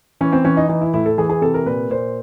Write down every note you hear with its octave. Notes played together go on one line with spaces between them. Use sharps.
E3 C#4
C4
E3 C#4
D#4
E3 D#4
E4
A2 E4
A4
E3 G#4
G#4
C3 A4
A#4
A#2 B4
A#2 C5